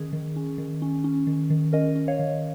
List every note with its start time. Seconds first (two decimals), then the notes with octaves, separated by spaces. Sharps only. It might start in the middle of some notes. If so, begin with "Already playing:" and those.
Already playing: D#3 C#4 G#4
0.13 D#3
0.36 C#4
0.58 D#3
0.82 C#4
1.04 C#4
1.27 D#3
1.50 D#3
1.73 C#4 A#4 D#5
1.96 C#4
2.08 C#5 F5
2.19 D#3